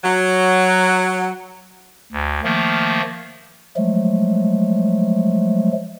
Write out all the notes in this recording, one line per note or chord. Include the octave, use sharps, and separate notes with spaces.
F#3
D2
D#3 F3 A3 A#3
F3 F#3 G#3 A3